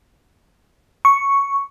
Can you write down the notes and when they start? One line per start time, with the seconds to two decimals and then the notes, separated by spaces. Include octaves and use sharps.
1.05 C#6